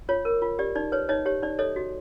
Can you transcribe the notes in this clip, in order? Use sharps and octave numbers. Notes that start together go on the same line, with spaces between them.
F4 C#5
A#4
F4
G4 D5
D#4 D5
B4 C#5
D#4 C#5 D#5
G4 C#5
D#4 D5
A4 C#5 D#5
F#4